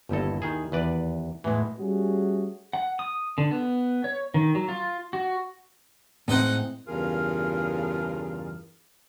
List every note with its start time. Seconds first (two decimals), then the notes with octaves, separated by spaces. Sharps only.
0.09 G1 D#2 E4 A4 D#5
0.42 D#3 G#4
0.72 E2 B4 D5
1.44 E2 A2 E3 G#3
1.79 G3 A3 C#4 F#4 G#4
2.73 F#5
2.99 D#6
3.38 D3
3.51 B3
4.04 C#5
4.34 D#3
4.55 F#3
4.69 F4
5.13 F#4
6.28 A2 G#3 C4 D#4 F#5
6.88 E2 G2 C#3 F4 G#4 A#4